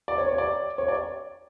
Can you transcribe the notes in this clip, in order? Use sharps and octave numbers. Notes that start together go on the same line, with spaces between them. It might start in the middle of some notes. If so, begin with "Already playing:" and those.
D5
C#5
C#5
D5
C#5
D5